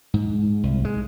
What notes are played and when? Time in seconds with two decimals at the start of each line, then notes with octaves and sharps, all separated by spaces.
0.14 G#2
0.63 C2
0.85 G#3